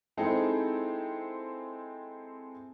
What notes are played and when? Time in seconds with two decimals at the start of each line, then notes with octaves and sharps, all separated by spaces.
0.17 G#3 C4 D#4 E4 G#4 A4